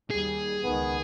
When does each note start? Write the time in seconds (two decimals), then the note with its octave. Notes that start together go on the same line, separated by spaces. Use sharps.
0.11 D#2 G3 G#4
0.64 C#2 D#3 B3